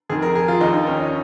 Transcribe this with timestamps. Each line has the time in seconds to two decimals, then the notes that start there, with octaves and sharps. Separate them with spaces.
0.09 F2 D#3 G#4
0.22 A#4
0.35 G#4
0.48 F4
0.61 D#2 D#3 D#4
0.74 D#4
0.87 C#4
1.00 D#4